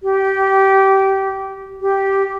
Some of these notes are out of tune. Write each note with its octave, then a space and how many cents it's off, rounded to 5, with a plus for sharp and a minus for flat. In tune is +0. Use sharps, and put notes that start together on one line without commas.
G4 -20
G4 -5